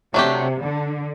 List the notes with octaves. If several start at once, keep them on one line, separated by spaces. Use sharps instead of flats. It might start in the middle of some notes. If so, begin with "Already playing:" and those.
C3 F#3 A3 D4 G4
D3